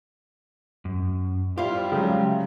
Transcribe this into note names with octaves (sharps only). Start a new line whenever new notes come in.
F#2
G3 E4 F4 G4 C5 F5
C#3 F#3 G#3 G5